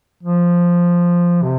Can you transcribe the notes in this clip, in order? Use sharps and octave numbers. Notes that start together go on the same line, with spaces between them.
F3
C3